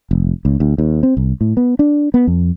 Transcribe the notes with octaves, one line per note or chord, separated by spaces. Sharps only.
F1
C#2
D2
D#2
C4
C2
A2
B3
D4
B3
F2